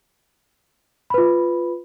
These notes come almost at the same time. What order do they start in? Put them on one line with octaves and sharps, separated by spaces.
B5 B4 F4